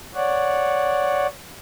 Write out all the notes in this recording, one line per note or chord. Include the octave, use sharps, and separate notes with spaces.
C#5 D5 F#5